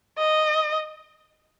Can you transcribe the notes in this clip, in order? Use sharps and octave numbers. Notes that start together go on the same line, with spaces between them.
D#5